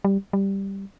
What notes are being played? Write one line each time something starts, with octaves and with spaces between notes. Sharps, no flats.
G3
G3